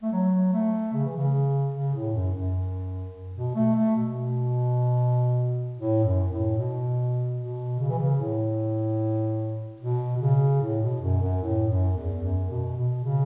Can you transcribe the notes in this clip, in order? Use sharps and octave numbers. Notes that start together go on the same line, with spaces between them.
A3
F#3
A3
C#3
E3
C#3
C#3
A2
F#2
F#2
B2
A3
A3
B2
A2
F#2
A2
B2
B2
C#3
E3
C#3
A2
B2
B2
C#3
A2
B2
F#2
F#2
A2
F#2
E2
F#2
B2
B2
C#3